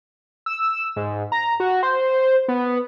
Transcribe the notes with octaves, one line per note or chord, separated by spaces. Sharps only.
E6
G#2
A#5
F#4
C5
B3